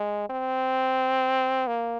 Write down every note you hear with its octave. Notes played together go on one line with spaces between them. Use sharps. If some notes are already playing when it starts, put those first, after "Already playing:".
Already playing: G#3
C4
A#3